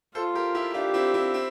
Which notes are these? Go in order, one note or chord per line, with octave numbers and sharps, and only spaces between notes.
F4 A4 C5
G4 A#4
E4 G4
D4 F4 G4
C4 E4
C4 E4
C4 E4